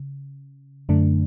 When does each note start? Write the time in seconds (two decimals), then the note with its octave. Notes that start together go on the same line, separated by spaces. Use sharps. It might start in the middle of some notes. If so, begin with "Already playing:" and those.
Already playing: C#3
0.89 F#2 D3 A3 D4